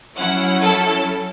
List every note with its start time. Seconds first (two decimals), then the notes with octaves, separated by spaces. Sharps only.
0.17 F#3 C#4 E4 F#5
0.62 A4